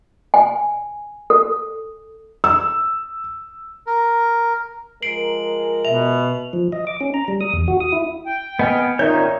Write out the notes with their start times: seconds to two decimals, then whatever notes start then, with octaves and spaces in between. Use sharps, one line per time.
0.34 G#5
1.30 A4
2.44 E6
3.87 A#4
5.03 F3 G#3 A#4 C7 D7 F#7
5.85 B2 E5 F7
6.53 F3
6.72 D#5
6.87 D6
7.01 C#4
7.14 A#5
7.28 G3
7.41 D#6
7.53 E2
7.68 F#4
7.80 D#6
7.92 E4
8.26 G5
8.59 B3 B4 D#5 G#5 F6
8.99 A#2 D#3 D#4 A#4 C#5 D5 E5 G6